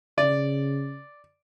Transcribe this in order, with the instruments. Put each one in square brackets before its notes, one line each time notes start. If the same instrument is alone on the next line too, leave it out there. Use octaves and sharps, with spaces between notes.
[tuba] C#3 [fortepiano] D5